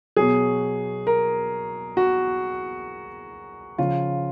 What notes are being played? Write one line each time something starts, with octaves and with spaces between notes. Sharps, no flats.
B2 F#3 G#4
A#4
F#4
C#3 F3 F4